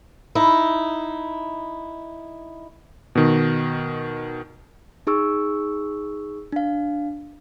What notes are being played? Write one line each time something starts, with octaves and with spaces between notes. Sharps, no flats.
D#4 E4
B2 D#3
D#4 G#4 C#6 E6
D4 F5